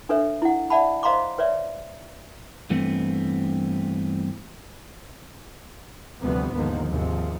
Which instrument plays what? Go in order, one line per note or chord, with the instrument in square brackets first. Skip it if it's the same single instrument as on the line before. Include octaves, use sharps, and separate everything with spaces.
[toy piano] D4 A4 B4 C#5 E5
E4 F#5
D5 E5 F#5 A5 B5
C5 D#5 F5 A#5 C6 D6
B4 C#5 D5 E5
[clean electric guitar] G2 E3 A3 B3 C4
[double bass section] D2 C3 E3 F3 G3 B3
D#2 G#2 D3 D#3 F3
D#2 G#2 C3 F3